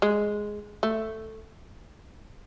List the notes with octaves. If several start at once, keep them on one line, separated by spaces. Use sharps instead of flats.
G#3
A3